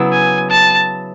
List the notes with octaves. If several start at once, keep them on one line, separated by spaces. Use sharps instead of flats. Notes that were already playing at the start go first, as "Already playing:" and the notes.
Already playing: C#3 F#3 B3 E4
G#5
A5